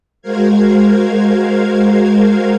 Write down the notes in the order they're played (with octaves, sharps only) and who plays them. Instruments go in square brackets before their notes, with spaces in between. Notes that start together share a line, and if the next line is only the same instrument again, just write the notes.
[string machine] G#3 F#4 A#4 C5 F5 G#6